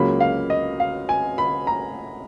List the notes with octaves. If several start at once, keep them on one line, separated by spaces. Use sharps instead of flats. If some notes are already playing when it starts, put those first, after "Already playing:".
Already playing: C#2 C#3 F#3 A#3 B5
F5
D#5
F5
G#5
B5
A#5